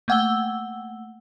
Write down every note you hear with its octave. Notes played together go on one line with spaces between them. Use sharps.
A3 A#3 F#5 G5 E6 G7